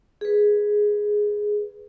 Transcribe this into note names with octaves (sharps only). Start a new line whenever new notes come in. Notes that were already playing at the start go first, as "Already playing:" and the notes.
G#4 B4